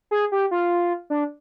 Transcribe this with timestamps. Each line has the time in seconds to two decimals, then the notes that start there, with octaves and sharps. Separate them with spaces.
0.11 G#4
0.32 G4
0.51 F4
1.10 D4